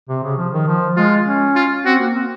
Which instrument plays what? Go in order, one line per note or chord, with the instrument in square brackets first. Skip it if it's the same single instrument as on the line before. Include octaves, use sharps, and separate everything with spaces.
[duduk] C3
C#3
F3
D#3
F3
[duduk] G#3 [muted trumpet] F4
[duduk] C#4
[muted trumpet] F4
[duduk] C4 [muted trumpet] F#4
[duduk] A#3
C4